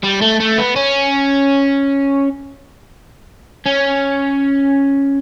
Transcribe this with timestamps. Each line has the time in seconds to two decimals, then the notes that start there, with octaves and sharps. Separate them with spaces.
0.04 G3
0.22 A3
0.40 A3
0.58 B3
0.76 C#4
3.66 C#4